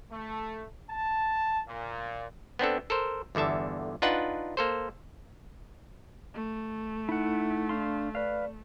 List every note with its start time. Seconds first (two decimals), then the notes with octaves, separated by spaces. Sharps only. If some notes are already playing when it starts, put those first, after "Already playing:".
0.12 A3
0.90 A5
1.67 A#2
2.59 B3 C4 D4 A4
2.90 A4 A#4 C5
3.35 G1 E2 D3 E5 A5
4.02 D4 D#4 F4 B4 F#5
4.57 A#3 A4 C5
6.34 A3
7.09 D#4 E4 F#5
7.69 D4 F5 C6
8.15 B4 D5 F5